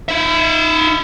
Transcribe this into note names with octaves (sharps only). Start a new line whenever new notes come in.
D#4 E5